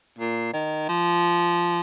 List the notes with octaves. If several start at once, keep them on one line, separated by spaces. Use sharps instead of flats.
A#2
D#3
F3